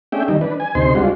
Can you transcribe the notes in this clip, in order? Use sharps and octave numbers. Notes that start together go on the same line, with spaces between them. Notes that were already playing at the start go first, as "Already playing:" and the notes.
A3 C#4 D4 G#4 E5 G5
D#3 E3 G3 D#4
D4 B4
G#5
D2 C3 D#4 C5 C6
G3 G#3 D4 F4 F#4